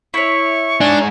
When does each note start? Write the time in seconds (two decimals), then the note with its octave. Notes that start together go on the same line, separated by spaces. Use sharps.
0.14 E4 C#5 C#6
0.81 G#2 D4 G#5